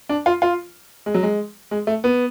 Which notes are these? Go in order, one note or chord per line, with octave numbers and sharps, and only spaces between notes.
D4
F4
F4
G#3
F#3
G#3
G#3
A3
B3